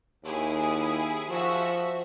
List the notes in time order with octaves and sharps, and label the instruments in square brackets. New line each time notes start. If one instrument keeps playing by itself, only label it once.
[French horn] D#2 [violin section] E4 G#4
[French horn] F3 [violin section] F#4 E5